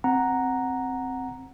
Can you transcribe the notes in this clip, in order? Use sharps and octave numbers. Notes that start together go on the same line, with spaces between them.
C4 F#5 A#5